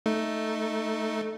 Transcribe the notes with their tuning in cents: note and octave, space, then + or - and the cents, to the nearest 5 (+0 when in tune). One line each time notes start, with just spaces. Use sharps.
A3 +0 D#4 +0